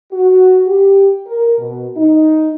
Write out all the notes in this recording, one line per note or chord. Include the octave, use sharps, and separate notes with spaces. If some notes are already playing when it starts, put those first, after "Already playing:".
F#4
G4
A#4
B2
D#4